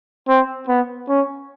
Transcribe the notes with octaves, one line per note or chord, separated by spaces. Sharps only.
C4
B3
C#4